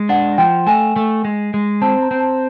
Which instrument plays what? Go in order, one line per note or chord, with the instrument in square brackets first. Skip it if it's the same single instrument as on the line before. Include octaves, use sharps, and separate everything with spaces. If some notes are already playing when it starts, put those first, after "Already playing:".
Already playing: [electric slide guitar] G#3
[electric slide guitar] D4 [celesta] F#5
[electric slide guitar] F3 [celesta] G5
[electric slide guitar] A3 [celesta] G#5
[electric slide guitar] A3
G#3
G#3
[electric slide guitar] C4 [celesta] A5
[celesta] A#5
[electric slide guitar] C4
[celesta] A5